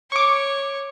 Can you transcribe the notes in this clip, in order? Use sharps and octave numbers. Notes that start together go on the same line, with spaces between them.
C#5 C#6 D6